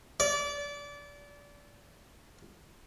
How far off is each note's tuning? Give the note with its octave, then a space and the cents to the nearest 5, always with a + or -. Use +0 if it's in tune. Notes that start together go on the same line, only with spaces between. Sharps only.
D5 -25